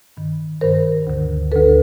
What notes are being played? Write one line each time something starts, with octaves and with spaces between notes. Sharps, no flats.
G2 D#3
G2 D#3 A#4 C5
D2 D3
D2 D3 A4 B4